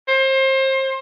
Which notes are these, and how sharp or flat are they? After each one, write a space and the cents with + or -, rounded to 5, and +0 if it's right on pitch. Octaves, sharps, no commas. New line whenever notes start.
C5 +30